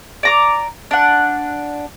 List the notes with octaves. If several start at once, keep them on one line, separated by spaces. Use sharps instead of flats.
D5 A#5 D6
D4 F#5